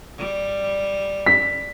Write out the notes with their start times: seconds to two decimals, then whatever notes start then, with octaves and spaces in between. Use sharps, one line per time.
0.18 G3
1.26 B6